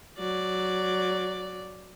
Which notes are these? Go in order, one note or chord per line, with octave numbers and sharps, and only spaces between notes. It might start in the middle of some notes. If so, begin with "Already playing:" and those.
F#3 D5